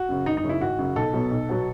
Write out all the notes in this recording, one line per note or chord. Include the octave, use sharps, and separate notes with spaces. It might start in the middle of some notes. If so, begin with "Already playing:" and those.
Already playing: F#4
F#2 C#3
G#1 D#4
D#4
F#2 C#3
E4
G#1 F#4
F#2 C#3
B1 A4
B2 F#3 B3
B1
B2 F#3 B3